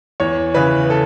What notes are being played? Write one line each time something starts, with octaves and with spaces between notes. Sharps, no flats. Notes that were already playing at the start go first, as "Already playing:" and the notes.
E2 C#5
C#3 E3 B4
A4